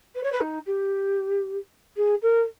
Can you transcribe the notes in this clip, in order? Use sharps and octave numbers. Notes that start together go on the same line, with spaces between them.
B4
C#5
B4
D#4
G4
G#4
A#4